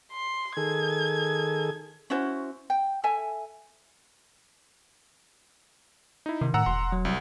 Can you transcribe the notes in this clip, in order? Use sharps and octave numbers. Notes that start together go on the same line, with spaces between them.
C6
D#3 G#4 A4 G#6
C#4 E4 F#4 C5
G5
A4 E5 G#5
D#4 E4
C3 D#3
A2 F#5 A#5 E6
E1 C6
F#3
C2